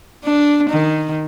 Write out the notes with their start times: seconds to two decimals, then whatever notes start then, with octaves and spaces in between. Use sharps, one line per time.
0.24 D4
0.70 D#3